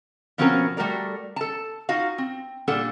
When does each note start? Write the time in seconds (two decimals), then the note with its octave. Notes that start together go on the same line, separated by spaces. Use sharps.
0.38 B2 F3 C4 C#4 F#4 A#4
0.77 G3 A3 F#4 A#4 D5
1.36 A4 A5
1.89 D#4 F4 F#4 F5
2.18 C4
2.68 A#2 G3 D4 A4 F#5